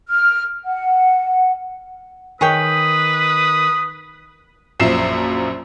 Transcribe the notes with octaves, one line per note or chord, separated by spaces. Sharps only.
F6
F#5
D#3 G#4 B4 C#5 G5 D#6
A#1 F#2 F3 E5 C7 E7